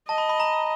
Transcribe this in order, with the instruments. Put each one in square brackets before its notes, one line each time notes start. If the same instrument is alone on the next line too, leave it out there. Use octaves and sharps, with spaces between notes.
[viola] D#5 [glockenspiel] A5
[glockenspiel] B5
B5
A#5